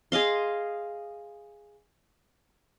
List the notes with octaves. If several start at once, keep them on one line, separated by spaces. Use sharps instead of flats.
G#4 D#5 F5 C6